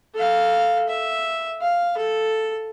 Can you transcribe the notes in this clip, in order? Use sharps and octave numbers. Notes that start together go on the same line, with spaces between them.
A4 F5
E5
F5
A4